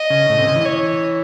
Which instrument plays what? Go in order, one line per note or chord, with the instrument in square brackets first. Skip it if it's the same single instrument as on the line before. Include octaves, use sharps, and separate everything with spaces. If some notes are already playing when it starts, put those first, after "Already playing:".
Already playing: [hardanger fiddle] D#5
[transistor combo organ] C#3
A2
C3
C#3
E3
[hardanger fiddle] C#5